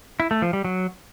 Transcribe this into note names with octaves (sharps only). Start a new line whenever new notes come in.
E4
A3
F3
G3
F#3